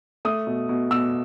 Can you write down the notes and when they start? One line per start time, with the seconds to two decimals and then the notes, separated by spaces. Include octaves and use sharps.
0.25 A3 D#6
0.47 B2
0.69 B2
0.91 B2 E6